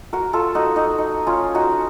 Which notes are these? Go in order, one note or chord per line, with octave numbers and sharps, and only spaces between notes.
F#4 A#4
F4 A4
D#4 F#4
D#4 F#4
D#4
C#4 F4
D#4 F#4